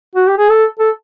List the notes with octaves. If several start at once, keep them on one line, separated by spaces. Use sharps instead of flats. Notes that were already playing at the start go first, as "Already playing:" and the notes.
F#4
G4
G#4
A4
A4